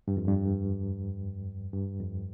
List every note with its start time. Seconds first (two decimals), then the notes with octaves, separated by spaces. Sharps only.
0.08 G2
0.17 F2
0.28 G2
1.73 G2
2.01 F2